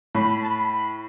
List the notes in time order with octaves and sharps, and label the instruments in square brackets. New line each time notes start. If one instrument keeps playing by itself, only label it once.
[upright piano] A2 [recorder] B5
[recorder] A5
B5